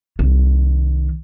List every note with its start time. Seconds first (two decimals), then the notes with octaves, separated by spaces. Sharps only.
0.19 C2 D#3